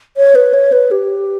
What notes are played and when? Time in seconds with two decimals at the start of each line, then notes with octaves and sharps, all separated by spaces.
0.17 C#5
0.35 B4
0.54 C#5
0.72 B4
0.91 G4